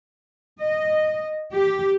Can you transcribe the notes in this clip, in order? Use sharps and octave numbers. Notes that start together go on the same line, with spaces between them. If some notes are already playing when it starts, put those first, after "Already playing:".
D#5
G4